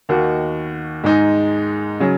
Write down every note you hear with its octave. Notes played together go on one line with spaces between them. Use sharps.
D#2 D#3 A#3 F#4
G#2 G#3 D#4
C#3 F#3